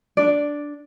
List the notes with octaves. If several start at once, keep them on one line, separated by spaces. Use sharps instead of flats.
D4 D5